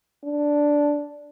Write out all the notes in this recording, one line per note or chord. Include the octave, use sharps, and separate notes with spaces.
D4